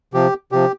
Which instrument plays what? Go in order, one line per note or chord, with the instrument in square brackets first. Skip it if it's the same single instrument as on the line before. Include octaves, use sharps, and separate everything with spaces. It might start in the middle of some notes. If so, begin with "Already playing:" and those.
[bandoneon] C3 F3 G4
C3 F3 G4